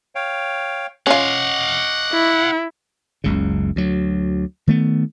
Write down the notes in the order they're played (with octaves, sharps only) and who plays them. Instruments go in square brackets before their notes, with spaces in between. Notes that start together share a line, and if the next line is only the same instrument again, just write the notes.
[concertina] C#5 F5 G5
[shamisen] C#4 F4 [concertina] D#5 C#6 D6 [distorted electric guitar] F5 F#5
[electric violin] E4
[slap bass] F#1 C#2 C#3
D2 F#3
D#3 A3 B3